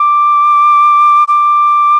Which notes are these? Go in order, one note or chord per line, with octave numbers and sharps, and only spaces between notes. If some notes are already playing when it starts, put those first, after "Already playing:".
Already playing: D6
D6